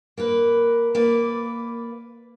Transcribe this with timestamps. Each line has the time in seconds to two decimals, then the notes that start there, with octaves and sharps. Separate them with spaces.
0.17 A#3 A#4 B4
0.95 A#3 B4 D5